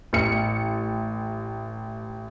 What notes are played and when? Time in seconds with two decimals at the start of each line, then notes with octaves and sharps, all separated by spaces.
0.13 A1 C#7